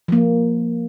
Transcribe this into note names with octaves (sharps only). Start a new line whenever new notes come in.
F3 A#3